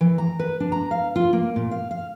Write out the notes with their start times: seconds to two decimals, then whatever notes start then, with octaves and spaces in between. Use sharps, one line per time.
0.01 E3
0.18 A#5
0.39 B4
0.60 D4
0.72 A#5
0.91 F5
1.16 F4
1.33 A#3
1.56 A#2
1.71 F5
1.91 F5